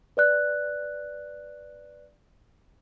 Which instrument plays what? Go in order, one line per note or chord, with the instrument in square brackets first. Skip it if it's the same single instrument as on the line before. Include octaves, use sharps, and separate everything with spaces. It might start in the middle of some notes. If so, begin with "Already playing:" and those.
[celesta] B4 D5 F#6